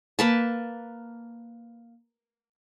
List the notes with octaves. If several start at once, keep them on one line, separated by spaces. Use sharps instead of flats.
A#3 B4 A5